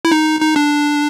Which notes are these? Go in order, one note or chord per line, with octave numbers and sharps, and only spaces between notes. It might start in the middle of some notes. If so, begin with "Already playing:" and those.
E4
D#4
D#4
D4